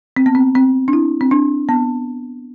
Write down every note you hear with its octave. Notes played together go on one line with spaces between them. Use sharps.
C4
B3
C4
C4
D4
E4
C4
D4
B3